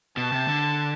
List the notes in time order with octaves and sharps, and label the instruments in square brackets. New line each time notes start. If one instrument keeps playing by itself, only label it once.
[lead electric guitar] B2 [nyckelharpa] A5
[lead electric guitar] C3
D3